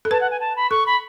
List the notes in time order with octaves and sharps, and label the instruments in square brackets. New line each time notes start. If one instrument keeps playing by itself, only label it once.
[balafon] A4
[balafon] B4 [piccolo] A5
[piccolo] F#5
G#5
A5
B5
[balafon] A4 [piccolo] C#6
[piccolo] B5